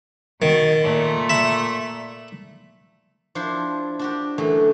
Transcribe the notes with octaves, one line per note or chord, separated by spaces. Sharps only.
B2 D#3 A6
A#2 A3
E5 B5
F3 D4 E4 C5
D4 F#4 G4
F#2 D3 E3 A3